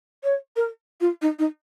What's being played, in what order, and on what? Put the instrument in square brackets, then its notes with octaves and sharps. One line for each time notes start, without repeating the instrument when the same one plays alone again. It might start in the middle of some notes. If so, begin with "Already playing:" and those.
[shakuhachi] C#5
A#4
F4
D#4
D#4